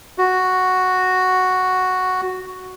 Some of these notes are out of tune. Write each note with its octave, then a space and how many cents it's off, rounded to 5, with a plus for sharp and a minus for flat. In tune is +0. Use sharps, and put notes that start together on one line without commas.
F#4 +0